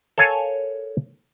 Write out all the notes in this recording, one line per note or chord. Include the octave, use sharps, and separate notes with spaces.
A4 A#4 C#5 F5 G#5